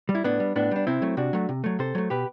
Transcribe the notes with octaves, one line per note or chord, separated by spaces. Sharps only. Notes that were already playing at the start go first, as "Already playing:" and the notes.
G3
E4
A2 B3 D4
G3
A2 B3 D4
G3 D4
C3 C4 E4
F#3 A3
C3 D4 F#4
F#3 A3
C3
F#3 A3
C3 A4 C5
F#3 A3
B2 G4 B4